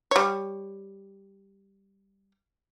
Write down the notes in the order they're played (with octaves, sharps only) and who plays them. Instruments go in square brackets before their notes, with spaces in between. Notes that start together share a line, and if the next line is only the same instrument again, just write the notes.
[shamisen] G3 C#5